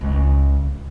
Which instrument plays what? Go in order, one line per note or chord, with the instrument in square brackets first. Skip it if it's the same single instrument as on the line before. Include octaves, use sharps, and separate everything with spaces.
[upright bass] C#2